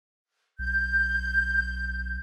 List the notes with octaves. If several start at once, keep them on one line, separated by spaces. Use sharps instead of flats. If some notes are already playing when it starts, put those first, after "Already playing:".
B1 G6